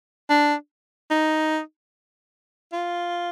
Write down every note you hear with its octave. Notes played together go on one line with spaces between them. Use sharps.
D4
D#4
F4